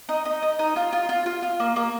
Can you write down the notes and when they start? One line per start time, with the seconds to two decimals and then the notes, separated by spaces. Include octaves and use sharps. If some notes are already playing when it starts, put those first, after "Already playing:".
0.09 D#4
0.25 D#4
0.42 D#4
0.59 D#4
0.76 F4
0.93 F4
1.09 F4
1.26 F4
1.43 F4
1.60 A#3
1.76 A#3